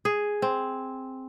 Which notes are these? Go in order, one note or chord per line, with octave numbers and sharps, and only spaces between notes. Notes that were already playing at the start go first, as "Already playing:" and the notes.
G#4
C4